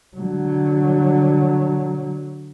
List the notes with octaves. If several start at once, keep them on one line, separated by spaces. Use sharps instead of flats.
D3 F#3